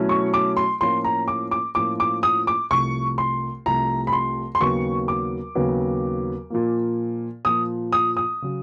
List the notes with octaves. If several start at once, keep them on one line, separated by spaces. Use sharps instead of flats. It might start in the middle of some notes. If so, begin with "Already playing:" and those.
Already playing: B2 F#3 A3 C#4 E4
C#6
D6
C6
A2 F3 A#3 C#4 F4 C6
A#5
D6
D6
A2 F3 A#3 C#4 F4 D6
D6
D#6
D6
C2 C3 F3 A3 C#6
C6
C2 C3 F3 A3 A#5
B5
C6
C6
D#2 C#3 F#3 B3 C#6
D6
D#2 C#3 F#3 B3
A#2 F3 A#3
A#2 F3 A#3 D#6
D#6
D#6
C#3 F#3